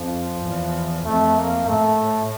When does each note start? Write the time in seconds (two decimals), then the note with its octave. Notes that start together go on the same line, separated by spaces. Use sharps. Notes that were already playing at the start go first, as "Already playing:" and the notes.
Already playing: F2 F3
0.43 E2
1.05 F2 A3
1.37 A#3
1.68 A2 A3